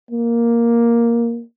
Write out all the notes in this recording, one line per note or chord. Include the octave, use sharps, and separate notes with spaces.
A#3